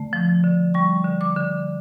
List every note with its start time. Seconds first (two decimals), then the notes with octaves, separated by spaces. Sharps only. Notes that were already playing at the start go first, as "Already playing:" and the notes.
Already playing: D3 A3
0.13 F3
0.44 D3
0.74 G3 C#6
1.05 D3
1.21 D6
1.36 D3